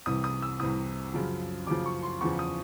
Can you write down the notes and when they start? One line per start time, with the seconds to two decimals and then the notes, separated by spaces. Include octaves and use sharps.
0.06 C2 C3 E3 D#6
0.24 D#6
0.42 E6
0.60 C2 C3 E3 D#6
1.14 F#2 C#3 F3
1.67 F#2 C#3 F3 D6
1.86 C#6
2.03 C6
2.21 E2 C#3 F3 C#6
2.39 D#6